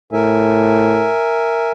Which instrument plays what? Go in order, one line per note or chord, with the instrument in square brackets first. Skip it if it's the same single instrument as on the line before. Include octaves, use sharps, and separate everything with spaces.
[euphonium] A2 [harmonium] A#4 E5 G#5